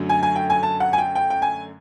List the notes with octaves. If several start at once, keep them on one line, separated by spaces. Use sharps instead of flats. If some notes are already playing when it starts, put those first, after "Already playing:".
Already playing: F#2 D3 F#3 A3
G#5
G#5
G5
G#5
A5
F#5
G#5
G5
G5
G5
G#5